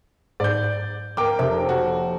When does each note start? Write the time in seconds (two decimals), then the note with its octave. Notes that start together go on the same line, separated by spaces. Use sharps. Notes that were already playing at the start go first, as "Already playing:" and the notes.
0.40 G#2 D5 G6
1.17 A#3 A#4 G5 D6
1.39 F1 C3
1.69 F#4